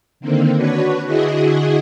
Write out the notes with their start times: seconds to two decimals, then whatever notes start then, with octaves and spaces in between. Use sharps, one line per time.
0.20 D3 D#3 A#3 C4
0.56 D4 F#4 B4 C#5
1.05 D3 E4 F#4 G#4 D#5